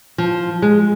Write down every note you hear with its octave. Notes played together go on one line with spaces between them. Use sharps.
F3
G#3